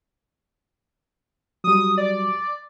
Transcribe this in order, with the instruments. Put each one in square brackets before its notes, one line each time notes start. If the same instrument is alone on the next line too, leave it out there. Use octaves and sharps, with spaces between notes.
[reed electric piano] F#3 G3 [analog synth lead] D#6
[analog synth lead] D5